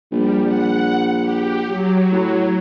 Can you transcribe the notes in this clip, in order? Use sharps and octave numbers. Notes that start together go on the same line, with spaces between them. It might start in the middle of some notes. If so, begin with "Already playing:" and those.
A#1 G3
F#5
G4
F#3
A2